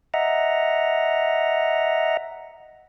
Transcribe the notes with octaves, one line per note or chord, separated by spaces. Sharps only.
D#5 E5 F#5 A#5